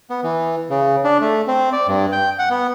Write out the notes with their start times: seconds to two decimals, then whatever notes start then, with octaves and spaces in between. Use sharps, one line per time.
0.10 B3
0.24 E3
0.70 C#3
1.05 D4
1.21 A3
1.48 C4
1.72 D5
1.88 G2
2.12 G5
2.39 F#5
2.50 B3